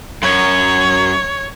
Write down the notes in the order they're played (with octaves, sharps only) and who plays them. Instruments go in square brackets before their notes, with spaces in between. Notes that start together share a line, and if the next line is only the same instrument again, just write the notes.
[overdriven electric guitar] F#2 [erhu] C#5